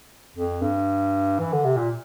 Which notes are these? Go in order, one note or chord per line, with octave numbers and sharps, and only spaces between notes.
F2
G2
E3
D3
C3
A#2